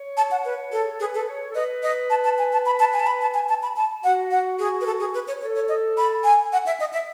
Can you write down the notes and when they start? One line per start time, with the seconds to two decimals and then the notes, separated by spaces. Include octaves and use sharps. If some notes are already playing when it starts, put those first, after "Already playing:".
Already playing: C#5
0.17 A5
0.31 F#5
0.45 B4
0.70 F#4 A4
0.81 G#4
0.90 A4
1.00 G#4 B4
1.15 A4
1.28 C#5
1.49 A4
1.55 B4 D#5
1.83 D#5
2.10 A5
2.24 A5
2.38 G#5
2.53 A5
2.66 B5
2.80 A5
2.93 G#5
3.00 A5
3.07 B5
3.22 A5
3.34 G#5
3.49 A5
3.63 B5
3.76 A5
4.04 F#4 F#5
4.31 F#5
4.59 G#4
4.81 B4
4.86 A4
5.00 G#4
5.14 B4
5.28 C#5
5.41 A4 C#5
5.55 C#5
5.69 D#5
5.97 B5
6.24 G#5
6.53 F#5
6.66 E5
6.80 D#5
6.93 E5